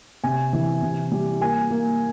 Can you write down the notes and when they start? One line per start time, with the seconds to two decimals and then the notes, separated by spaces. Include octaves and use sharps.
0.24 C3 G#5
0.53 E3
0.82 C3
1.11 G3
1.41 A#3 G#5
1.70 A#3